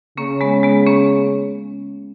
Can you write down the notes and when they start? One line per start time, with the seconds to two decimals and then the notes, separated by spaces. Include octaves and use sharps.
0.17 C#3 A#3 C#4
0.41 G#3 B3
0.63 G#3 B3
0.86 A#3 C#4